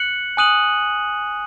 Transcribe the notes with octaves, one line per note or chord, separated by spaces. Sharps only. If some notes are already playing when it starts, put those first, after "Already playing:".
Already playing: F#6 C#7 F#7
G#5 D#6 F#6 D#7 F#7